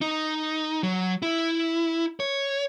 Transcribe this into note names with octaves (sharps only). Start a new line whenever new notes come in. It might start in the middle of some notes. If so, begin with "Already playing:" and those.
D#4
F#3
E4
C#5